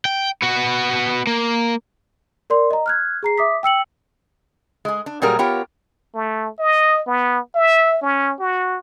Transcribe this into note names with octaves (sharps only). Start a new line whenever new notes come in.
G5
B3 F#4
A#3
A#4 D5 C6
D#5 A#5
F6 F#6 G#6
G#4 A#5 C7
E5 D6 D#6 B6
G5 E6 C#7 F#7
G#3 G#4
D4
A#2 F#3 G3 G#4 A#4
B3 F4 G4 A#4 C#5
A3
D#5
B3
E5
C#4
F#4